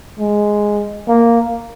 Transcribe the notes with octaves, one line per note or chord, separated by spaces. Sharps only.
G#3
A#3